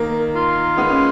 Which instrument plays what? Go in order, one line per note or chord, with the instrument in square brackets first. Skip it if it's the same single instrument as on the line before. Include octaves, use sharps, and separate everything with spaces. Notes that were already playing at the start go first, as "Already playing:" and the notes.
Already playing: [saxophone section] D#3 [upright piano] A#3
[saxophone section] F4
[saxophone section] G#3 [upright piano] B3
[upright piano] C#4